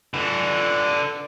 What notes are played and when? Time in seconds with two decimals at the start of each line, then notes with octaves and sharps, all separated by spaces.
0.14 D3 B4